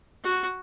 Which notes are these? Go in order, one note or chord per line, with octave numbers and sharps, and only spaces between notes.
F#4